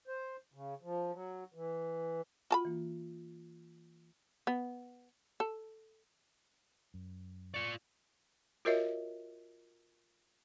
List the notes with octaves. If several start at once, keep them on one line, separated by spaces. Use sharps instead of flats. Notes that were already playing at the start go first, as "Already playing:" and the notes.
C5
C#3
F3
F#3
E3
F4 F#4 A5 B5
E3 A#3
B3
A4
F#2
F4 D5 C#6
F4 F#4 A#4 C#5 D#5 E5